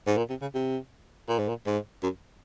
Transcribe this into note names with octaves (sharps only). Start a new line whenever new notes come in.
G#2
A#2
C3
C#3
C3
A#2
G#2
A#2
G#2
F#2